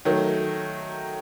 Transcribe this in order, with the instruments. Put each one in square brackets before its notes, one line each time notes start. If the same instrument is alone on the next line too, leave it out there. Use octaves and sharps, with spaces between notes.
[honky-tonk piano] D#3 F#3 A3